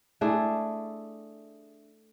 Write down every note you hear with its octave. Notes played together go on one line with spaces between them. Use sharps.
A3 D4 E4 G#4